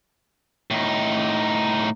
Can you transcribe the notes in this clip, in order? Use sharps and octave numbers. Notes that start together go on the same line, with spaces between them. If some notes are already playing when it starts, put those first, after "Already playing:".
A2 D#4